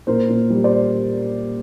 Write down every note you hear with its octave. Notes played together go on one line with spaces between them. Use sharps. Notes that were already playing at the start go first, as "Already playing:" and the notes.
A#2 A#4 C5
A#2
G3
C5 D5